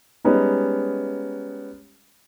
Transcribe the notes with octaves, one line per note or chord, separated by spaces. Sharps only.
G3 G#3 B3 C#4 D#4